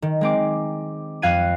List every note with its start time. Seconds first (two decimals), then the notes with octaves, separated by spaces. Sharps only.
0.02 D#3
0.21 G#3 C4 D6
1.22 F2 F5 F#6 G#6 D#7